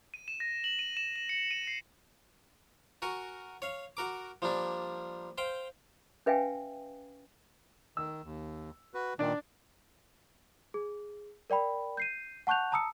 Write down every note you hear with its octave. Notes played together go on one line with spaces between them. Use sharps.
D#7
E7
A#6
F#7
D#7
E7
E7
C#7
D#7
C7
F#4 A#4 G#5 C#6
C#5 F5
F#4 A#4 D6
F3 G3 A#3 D4
C5 F5 G5
C#4 B4 E5 F5 G5 G#5
D#3 E6
D#2
F#4 B4
A#2 D#3 D4 D5
G#4
A#4 D5 G5 B5
G6 C7 D#7
F#5 A5 C#6 F#6 G6 F7
A5 A#5 D#6 E6 C#7